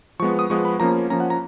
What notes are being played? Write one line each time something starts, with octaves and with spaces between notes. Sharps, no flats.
F3 G#3 B3 C#6
D#6
F3 G#3 B3 C#6
B5
F3 A#3 C#4 A#5
F3 A#3 C#4 A#5
F#5
A#5